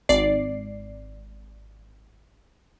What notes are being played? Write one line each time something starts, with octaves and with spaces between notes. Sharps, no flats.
G#1 D5 C7